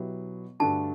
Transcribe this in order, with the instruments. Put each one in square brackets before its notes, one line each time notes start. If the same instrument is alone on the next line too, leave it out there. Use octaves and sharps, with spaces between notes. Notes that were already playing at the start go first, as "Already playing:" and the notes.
Already playing: [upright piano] B2 F#3 B3 E4 G4
[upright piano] G2 D3 A3 D4 F#4 [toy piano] A5